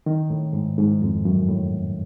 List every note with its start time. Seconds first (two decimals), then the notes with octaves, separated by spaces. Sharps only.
0.06 D#3
0.30 A2
0.53 G#2
0.78 G#2
1.02 F2
1.25 F#2
1.48 A2